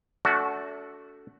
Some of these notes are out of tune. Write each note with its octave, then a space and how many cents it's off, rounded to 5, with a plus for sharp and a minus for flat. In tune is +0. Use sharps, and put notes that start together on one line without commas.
A3 +0 D4 -40 F#4 +0